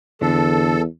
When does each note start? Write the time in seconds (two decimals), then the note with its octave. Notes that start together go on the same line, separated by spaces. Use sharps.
0.21 E2 D3 A4